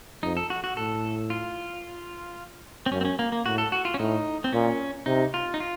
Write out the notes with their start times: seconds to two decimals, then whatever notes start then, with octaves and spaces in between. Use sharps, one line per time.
0.23 F2 D#4
0.37 A4
0.50 F#4
0.64 F#4
0.77 A2 A4
1.30 F4
2.86 C4
2.92 F#2 C#4
3.01 C4
3.05 C#4
3.19 A#3
3.32 A#3
3.46 A2 F#4
3.58 A4
3.72 F#4
3.85 F4
3.94 C#4
3.99 A2 D#4
4.44 C4
4.53 A#2 C#4
5.06 C3 D#4
5.34 F4
5.54 D#4
5.60 F4